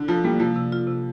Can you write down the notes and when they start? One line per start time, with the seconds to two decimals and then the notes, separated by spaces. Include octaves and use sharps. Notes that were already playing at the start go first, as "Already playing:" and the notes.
Already playing: D3
0.08 F3 F4
0.24 G3 A#3
0.40 C3 F3
0.56 C3
0.73 F4
0.88 C3